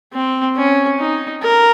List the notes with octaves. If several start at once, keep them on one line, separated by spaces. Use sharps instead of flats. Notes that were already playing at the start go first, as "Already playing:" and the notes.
C4
C#4
D#4
A#4